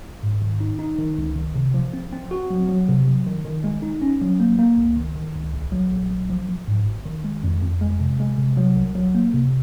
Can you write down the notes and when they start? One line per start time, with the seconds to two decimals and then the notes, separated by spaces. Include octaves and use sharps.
0.23 G#2
0.42 D#3
0.61 D#4
0.79 D#4
0.98 D#3
1.18 C#2
1.36 D#3
1.55 C3
1.74 F3
1.93 C4
2.13 C4
2.31 F#4
2.50 F#3
2.69 F#3
2.88 C3
3.08 F#3
3.27 D#3
3.44 D#3
3.64 G#3
3.82 D#4
4.02 C#4
4.21 F#3
4.40 A#3
4.59 A#3
4.77 C#2
4.96 D#3
5.16 D#3
5.35 C#2
5.53 A#1
5.72 F#3
5.91 A#1
6.11 F#3
6.30 F3
6.49 F3
6.67 G#2
6.86 G#1
7.05 D#3
7.24 G#3
7.43 F2
7.63 F2
7.81 G#3
8.00 C3
8.20 G#3
8.38 C3
8.57 F#3
8.76 C2
8.95 F#3
9.15 A#3
9.33 C3